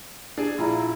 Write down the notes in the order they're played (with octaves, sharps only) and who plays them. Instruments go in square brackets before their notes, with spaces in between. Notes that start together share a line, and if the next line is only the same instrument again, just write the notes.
[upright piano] D4 G#4
[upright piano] A#1 F4 A#5 [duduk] E4